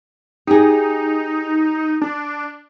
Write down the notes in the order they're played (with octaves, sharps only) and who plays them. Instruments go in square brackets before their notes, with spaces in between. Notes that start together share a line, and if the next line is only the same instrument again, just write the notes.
[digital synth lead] D#4 [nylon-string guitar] G4 G#4
[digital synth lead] D4